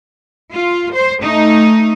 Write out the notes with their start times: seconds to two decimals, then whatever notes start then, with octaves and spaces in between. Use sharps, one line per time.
0.53 F4
0.93 C5
1.22 A3 D#4